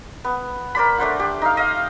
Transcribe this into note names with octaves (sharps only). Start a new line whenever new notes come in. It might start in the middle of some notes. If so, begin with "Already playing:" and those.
B3
A#4 C5 D5 B5
A3 D4 C5 F#5
G4
D#4 F5
D#5 F5